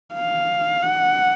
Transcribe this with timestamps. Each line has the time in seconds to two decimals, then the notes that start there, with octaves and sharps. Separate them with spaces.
0.14 F5
0.82 F#5